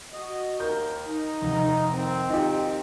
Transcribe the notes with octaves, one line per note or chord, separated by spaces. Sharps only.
F#4 D#5
D#2 A#4 G6
D#4
F1
D#3 C4
D#4 F4 G4